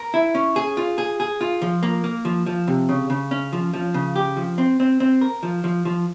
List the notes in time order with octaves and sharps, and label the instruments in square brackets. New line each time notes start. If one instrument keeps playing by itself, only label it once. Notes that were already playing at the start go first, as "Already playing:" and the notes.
Already playing: [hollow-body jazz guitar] A#4
E4
C#4
G#4
F4
G#4
G#4
F4
F3
A#3
A#3
F3
F3
C3
C#3
C#3
C#4
F3
F3
C#3
G4
F3
C4
C4
C4
A#4
F3
F3
F3